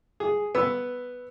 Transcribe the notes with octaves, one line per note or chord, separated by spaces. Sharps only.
G#4
B3 B4 E6